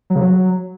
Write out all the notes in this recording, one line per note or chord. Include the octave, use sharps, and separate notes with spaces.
F#3
C#3
F#3